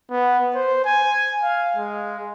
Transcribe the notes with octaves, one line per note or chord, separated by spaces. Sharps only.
B3
C5
G#5
F5
G#3